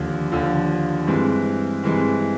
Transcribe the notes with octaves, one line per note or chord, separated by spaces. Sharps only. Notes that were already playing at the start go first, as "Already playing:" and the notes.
Already playing: D#2 D3 F3
D#2 D3 F3
G2 E3 G#3 C4
G2 E3 G#3 C4